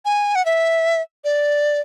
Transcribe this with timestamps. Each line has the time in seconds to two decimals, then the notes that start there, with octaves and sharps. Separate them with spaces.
0.05 G#5
0.35 F#5
0.46 E5
1.24 D5